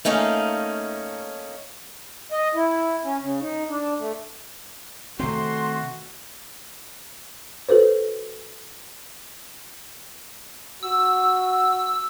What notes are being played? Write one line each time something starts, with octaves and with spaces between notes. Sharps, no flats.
A3 A#3 C#4 D#4 F5
D#5
E4
C#4
C#3
D#4
D4
A3
C3 D#3 A3 C4 F#4 C6
F#4 A4 B4 C5
F#4 E6